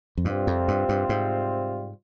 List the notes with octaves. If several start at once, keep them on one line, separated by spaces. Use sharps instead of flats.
F2
G2 C3 G3 C4 F4
F2
G2
G2
G#2